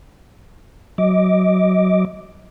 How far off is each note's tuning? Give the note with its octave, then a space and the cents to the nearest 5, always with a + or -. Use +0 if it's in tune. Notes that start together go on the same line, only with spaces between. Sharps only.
F#3 +5 D#5 +20 D6 +0